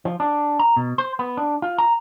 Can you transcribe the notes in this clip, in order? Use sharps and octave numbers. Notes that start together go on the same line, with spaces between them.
F3
D4
A#5
B2
C5
B3
D4
F4
A#5